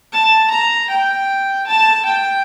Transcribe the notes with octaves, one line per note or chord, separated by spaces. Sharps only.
A5
A#5
G5
A5
G5